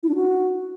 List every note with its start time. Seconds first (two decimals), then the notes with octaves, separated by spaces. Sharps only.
0.03 E4
0.09 D4
0.15 F#4